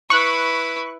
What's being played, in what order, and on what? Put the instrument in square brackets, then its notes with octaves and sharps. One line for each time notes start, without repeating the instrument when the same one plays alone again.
[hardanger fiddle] E4 B4 [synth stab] C#6 F#6